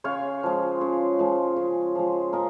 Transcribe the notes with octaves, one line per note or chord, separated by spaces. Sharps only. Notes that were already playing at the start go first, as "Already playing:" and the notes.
C#3 C#5 F5
F3 G#3
C#3
F3 G#3
C#3
F3 G#3
C#3 A#4 D#5